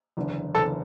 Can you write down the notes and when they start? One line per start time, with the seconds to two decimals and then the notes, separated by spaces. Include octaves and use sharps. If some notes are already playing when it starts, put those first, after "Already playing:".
0.17 F#1 E2 D3
0.55 F#1 E2 D3 A4 A5